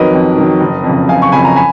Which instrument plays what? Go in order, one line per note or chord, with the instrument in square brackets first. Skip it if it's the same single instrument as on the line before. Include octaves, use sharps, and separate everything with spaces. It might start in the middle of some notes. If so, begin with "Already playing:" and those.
Already playing: [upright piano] F2 D#3 F#3 A#4 B4 C#5 D#5
F2
D#3 F#3
F#1
F2
C#3
F#1 F5 G#5
C#6
F2 C#3 G#5 B5
A#5
G#5 B5